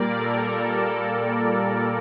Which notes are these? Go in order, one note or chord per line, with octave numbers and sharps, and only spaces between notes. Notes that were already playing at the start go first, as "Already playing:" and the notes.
Already playing: A#2 G3 A#3 A#4 D5
A4